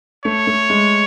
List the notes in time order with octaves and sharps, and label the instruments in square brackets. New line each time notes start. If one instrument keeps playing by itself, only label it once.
[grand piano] A3 [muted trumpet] C#5
[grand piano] A3
G#3